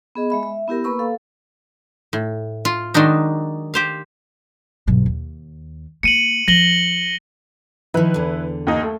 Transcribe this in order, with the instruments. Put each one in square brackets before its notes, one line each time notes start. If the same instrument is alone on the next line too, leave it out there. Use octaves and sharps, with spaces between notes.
[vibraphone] B3 G#4 D#5
G#3 E5 B5
E5
B3 E4 G4 A#4
A#3 B4 B5 C#6 E6
A4 F5
[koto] A2
F4
D#3 F#3 G#3 D4 D#4
G4 C5 F5
[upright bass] B1 G2
D#2
[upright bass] A#3 [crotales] C#7 D#7 F#7
[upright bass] F3 [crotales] A#6 F#7 G7
[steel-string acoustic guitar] D#3 F3 [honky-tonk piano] E4 B4
[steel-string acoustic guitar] E2 D3
[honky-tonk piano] D#2 D#4
A3